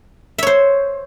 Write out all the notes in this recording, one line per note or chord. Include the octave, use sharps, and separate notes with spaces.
C5 C#5 E5